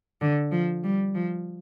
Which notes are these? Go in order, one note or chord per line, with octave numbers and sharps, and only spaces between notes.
D3
F3
G3
F3